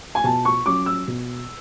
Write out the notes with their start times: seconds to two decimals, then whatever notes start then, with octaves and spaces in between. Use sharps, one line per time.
0.15 G#5
0.24 B2 A5
0.45 C#6
0.66 F#3 C#4 D6
0.86 E6
1.08 B2